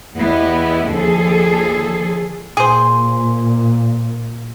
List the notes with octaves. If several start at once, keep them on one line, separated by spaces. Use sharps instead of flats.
E2 B3 E4 G4 D#5
D#2 D3 F3 G#4 A4
A#2 G#4 C5